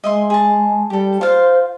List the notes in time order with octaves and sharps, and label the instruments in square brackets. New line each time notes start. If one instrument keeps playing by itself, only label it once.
[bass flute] G#3 [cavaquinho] D#5 E5 C6
[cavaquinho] G#4 A5
[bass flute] G3 [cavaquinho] G4 A4
[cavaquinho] F4 F5 [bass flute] C5